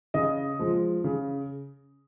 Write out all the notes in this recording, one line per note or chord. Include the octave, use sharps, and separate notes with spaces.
C#3 D#5
F3 G#3
C#3